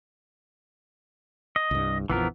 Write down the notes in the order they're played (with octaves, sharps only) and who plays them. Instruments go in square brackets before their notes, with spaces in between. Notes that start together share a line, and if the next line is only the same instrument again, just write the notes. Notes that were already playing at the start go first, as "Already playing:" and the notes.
[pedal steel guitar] D#5
[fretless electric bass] C2 G2
[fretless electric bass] A#1 F2 F3 [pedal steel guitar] E3 B3 A#4